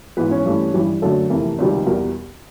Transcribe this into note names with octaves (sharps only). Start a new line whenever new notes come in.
G#2 E3 G#3 B3 B4
C#4 C#5
G2 E3 A3
G2 E3 G3
F#2 D3 F#3 A3 A4
F2 C3 E3 A3 A#4
C#2 C3 D#3 G3
E2 B2 G3 A#4